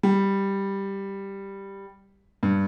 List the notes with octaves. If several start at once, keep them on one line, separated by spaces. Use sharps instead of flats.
G3
G2